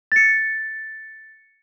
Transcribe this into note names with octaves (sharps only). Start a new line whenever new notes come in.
A6 C#7